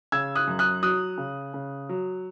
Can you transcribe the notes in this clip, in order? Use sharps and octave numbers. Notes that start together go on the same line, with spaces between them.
C#3 E6 G#6
D#6 F#6
F#2
D#6 F#6
F#3 D#6 F#6
C#3
C#3
F#3